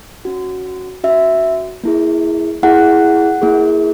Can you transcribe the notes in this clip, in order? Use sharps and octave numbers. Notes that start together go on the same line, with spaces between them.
C#4 F#4
C#4 F#4 E5
A#3 E4 G#4
A#3 E4 G#4 F#5
A#3 E4 G#4